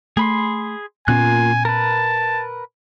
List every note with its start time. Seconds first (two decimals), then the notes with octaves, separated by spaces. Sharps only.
0.17 A3 G#4 B5 C6
1.08 A#2 A#3 B3 C#4 F4 G#5 F#6
1.65 A#4 B4 A5